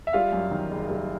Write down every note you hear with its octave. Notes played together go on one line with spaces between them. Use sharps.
E5
G3 F4 F5
F#2
D#3
F#1
G3